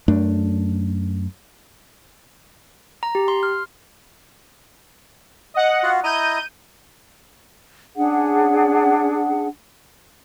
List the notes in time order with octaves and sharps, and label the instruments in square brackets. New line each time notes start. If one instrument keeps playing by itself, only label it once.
[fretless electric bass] F#2 A3 D4
[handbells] A#5
G4
C6
F6
[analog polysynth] D#5 F#5
[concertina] F4 F#4
[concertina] E4 D#5 A#5 [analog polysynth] G6 D#7
[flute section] C#4 D4 G#4 F#5